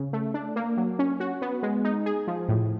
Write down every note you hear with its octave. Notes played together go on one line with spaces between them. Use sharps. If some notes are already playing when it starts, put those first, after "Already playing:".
Already playing: C#3
A3
D4
A#3
F#3
C#4
F#4
B3
G#3
D#4
G#4
F3
A2